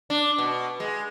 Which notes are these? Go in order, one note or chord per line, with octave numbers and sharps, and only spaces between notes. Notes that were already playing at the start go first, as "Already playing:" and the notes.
D4
B2
G#3